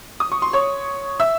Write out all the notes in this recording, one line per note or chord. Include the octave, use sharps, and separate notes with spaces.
D#6
C#6
C6
C#5 C#6
E5 E6